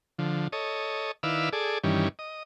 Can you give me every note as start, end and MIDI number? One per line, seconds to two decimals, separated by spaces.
0.19 0.48 50
0.19 0.48 53
0.52 1.12 69
0.52 1.12 73
0.52 1.12 75
1.23 1.49 51
1.23 1.49 64
1.23 1.49 71
1.23 1.49 74
1.23 1.49 77
1.23 1.49 88
1.53 1.78 68
1.53 1.78 69
1.53 1.78 74
1.83 2.08 43
1.83 2.08 51
1.83 2.08 52
1.83 2.08 55
1.83 2.08 61
2.19 2.43 75